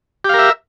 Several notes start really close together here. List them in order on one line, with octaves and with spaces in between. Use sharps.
G4 F5 A#4 E5